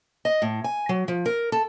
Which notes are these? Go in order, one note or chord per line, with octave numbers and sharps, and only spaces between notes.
D#5
A2
G#5
F#3
F3
A#4
A4